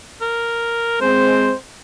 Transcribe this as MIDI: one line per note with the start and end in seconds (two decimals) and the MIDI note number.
0.21 0.96 70
1.01 1.51 56
1.01 1.51 60
1.01 1.54 72